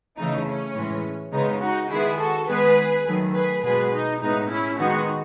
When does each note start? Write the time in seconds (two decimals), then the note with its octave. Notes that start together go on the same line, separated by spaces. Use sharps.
0.17 C#3 E3 A3 D#4
0.46 C#4
0.74 A2 E3 G#3
1.32 C#3 G#3 B3 D#4
1.61 D#4 F#4
1.90 D#3 G#3 B3 E4 G#4
2.19 F#4 A4
2.48 D#3 G#3 B3 G#4 B4
3.06 D#3 F#3 A3
3.34 G#4 B4
3.63 B2 G#3 B3 G#4 B4
3.93 D#4
4.21 A2 G#3 B3 D#4
4.50 C#4 E4
4.78 D#3 G#3 B3 D#4 F#4